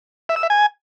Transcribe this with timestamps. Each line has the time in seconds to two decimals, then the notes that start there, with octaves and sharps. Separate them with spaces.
0.29 E5
0.36 E6
0.43 E5
0.50 G#5